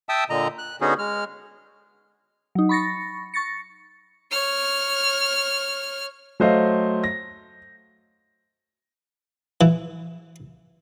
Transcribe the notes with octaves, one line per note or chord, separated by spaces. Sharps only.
E5 G5 A5 D#6 E6
A#2 D3 D#5 A#5
F#6
D3 B3 C#4 D#4 F#4 G#4
G#3 F6
F#3 D#4
B5 C#6 A6 A#6 C#7
C#6 A6 A#6 C#7
C#5 F6
F#3 A3 C5 D#5 F5
A#6
E3